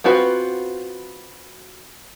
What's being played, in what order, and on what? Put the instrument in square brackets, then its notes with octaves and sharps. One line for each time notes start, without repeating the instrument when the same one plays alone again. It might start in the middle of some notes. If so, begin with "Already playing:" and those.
[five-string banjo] B3 C4 F4 F#4 B4